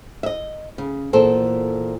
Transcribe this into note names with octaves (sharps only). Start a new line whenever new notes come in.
D#5 E5
C#3
E2 A#2 A4 C5